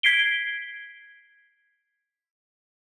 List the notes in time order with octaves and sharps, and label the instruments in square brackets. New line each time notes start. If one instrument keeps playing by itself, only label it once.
[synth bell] G#6 B6 C7 D7 G7